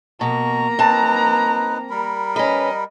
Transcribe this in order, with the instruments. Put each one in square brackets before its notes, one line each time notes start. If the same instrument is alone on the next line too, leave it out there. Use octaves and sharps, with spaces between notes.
[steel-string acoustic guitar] B2 [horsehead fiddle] A#3 A#5 [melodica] C#6
[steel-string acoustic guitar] C4 A5 [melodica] D#4 B4
[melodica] G3 A#4 B5
[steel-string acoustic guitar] C#4 B4 [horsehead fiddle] D#5